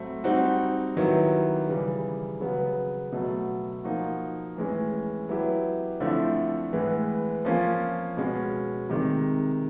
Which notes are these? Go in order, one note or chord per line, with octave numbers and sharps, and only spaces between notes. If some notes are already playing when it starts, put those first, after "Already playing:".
Already playing: A2 F#3 A3 C4
G3 C4 D#4 F#4
D#3 F#3 B3 E4 G4
C#3 E3 G3
C#3 F#3 B3
B2 F#3 A3
F3 A#3 D#4 F#4
A2 E3 G#3 C#4
F#3 B3 E4 G4
D3 F3 A3 C4 E4
A2 E3 G#3 B3
F3 A#3 C#4 F4
B2 G#3 C#4
C3 D#3 G#3